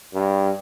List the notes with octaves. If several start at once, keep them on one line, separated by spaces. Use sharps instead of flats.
G2